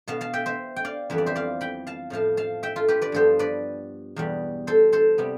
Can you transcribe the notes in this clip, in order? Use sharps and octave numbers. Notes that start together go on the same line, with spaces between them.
B2 B3 F5 A5
F5 A5
E5 G5
C5 E5
G5
D5 F5
F2 E3 G3 B3 E5
D5
C5 E5
D5 F5
G5 B5
F5 A5
A2 F3 A3 F5 A5
F5 A5
E5 G5
F4 A4
G4 B4
B4 D5
G2 F3 B3 A4 C5
B4 D5
E2 B2 G3
A4 C5
A4 C5
C3 G3 B3